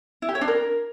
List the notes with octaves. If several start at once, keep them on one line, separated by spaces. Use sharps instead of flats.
E4
G4
C#5
D4
A#4